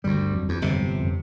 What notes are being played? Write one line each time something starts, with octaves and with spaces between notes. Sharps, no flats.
G1 D2 G3
F2 F#3
E2
G1 C3
F2